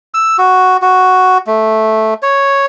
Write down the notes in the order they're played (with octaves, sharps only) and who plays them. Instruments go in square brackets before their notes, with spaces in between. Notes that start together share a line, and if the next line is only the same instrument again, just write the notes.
[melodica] E6
F#4
F#4
A3
C#5